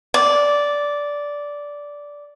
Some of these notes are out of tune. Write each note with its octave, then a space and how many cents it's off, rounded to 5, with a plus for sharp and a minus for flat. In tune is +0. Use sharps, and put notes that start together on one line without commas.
D5 -10